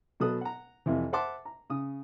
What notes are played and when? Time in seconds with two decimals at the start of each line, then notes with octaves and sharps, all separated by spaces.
0.20 B2 F#3 A4 D#6 F#6
0.41 F#5 A#5
0.86 F2 C3 E3
1.13 C5 E5 F#5 A5 C6 D6
1.45 A#5
1.70 C#3 D#6